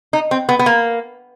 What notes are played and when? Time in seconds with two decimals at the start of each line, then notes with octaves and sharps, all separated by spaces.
0.13 D#4
0.31 C4
0.49 B3
0.59 B3
0.66 A#3